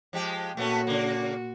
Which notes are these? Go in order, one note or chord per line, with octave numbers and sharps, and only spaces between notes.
F3 G#3 G4
A#2 A3 B3 C#4 F#4
C#3 A#3